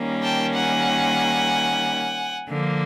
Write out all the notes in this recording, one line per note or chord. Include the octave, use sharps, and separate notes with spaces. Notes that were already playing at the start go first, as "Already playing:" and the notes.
Already playing: D#3 G3 A#3 C#4
G5 A5
F#5 G#5
D3 F3 A#3